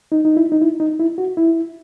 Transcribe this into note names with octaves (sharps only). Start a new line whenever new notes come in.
D#4
D#4
E4
D#4
E4
D#4
E4
F#4
E4